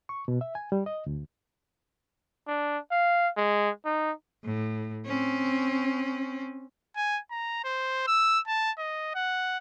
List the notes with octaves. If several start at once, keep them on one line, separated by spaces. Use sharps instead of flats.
C#6
B2
E5
G#5
G3
D#5
D2
D4
F5
G#3
D#4
A2
C4 C#4
G#5
A#5
C5
E6
A5
D#5
F#5